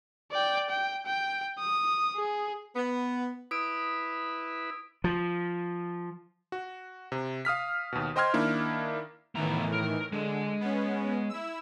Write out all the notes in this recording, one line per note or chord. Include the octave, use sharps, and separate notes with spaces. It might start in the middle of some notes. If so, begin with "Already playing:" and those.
D5 G5
G5
G5
D#6
G#4
B3
E4 B4 D#6 D7
F3
F#4
C3
F5 D#6 F6 B6
D#2 B2
C5 D#5 G5 C6 F6 G#6
D#3 A#3 D4 E4
A2 D#3 E3 B3 A#5
A#4
D3 G#3
B3 C#4
E4 E6